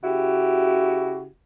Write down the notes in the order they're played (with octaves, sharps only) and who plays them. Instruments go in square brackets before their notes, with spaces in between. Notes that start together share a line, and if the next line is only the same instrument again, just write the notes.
[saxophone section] C#3 E4 F#4 G4